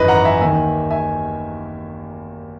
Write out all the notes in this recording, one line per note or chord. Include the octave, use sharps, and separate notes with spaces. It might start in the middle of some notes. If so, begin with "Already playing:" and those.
Already playing: G#1 F#2 E3 B4 D#5
F#5 A#5
E5 G#5
D#2 D#3 E5 G#5
E5 G#5